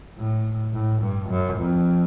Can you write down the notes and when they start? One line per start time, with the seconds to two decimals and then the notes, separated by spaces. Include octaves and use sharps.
0.18 A2
0.73 A2
1.02 G2
1.30 F#2
1.58 F2